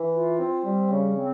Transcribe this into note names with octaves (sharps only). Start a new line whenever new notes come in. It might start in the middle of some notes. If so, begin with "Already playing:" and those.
Already playing: E3
F4
C4
G3
C#3
C4